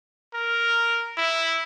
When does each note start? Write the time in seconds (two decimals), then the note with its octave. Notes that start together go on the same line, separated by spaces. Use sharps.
0.34 A#4
1.18 E4